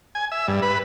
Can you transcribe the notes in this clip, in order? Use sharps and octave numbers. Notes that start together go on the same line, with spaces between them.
G#5
E5
G2
B4